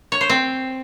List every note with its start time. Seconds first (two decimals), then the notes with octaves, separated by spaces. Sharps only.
0.12 C#5
0.21 C5
0.30 C4